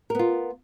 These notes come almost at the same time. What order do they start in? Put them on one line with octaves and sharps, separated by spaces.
A#4 B3 F4